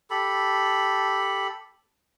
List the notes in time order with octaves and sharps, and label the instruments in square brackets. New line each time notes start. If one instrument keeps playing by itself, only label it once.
[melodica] G4 A4 B5